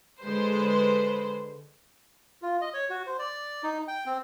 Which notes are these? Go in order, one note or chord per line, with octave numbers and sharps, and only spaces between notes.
D3 G#3 B4 C5
F4
D#5
C#5
F#4
C5
D5
D#4
G5
C4